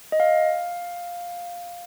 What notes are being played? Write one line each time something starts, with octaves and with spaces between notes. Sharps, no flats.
D#5
F5